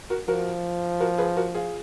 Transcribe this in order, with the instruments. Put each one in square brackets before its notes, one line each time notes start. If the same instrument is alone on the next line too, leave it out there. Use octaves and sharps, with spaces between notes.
[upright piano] F#4 A#4
[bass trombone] F3 [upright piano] F#4 A#4
[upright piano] F#4 A#4
G#4 B4
F#4 A#4
F4 G#4